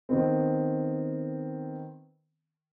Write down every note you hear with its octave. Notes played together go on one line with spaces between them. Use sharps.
D#3 B3 C4